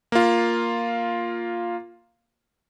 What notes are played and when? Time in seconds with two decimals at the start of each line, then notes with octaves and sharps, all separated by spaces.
0.12 A#3 F4